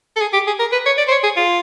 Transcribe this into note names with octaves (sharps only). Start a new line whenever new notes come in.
A4
G#4
G4
G#4
A#4
B4
C#5
D5
C5
C#5
G#4
F4